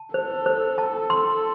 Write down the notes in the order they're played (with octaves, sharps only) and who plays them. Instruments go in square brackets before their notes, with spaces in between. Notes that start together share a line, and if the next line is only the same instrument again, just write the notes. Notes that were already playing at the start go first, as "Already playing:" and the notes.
Already playing: [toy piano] A5
[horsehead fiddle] A4 [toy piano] C5
[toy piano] C5
A5
C6